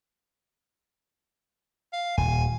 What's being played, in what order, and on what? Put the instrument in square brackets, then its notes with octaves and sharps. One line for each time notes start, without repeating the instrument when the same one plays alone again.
[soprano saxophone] F5
[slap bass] D#1 [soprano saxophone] G#5